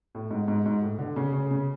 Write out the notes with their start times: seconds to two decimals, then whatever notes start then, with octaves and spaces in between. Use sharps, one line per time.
0.15 A2
0.31 G#2
0.48 G#2
0.66 G#2
0.82 A2
0.99 D3
1.16 C#3
1.33 C#3
1.50 C#3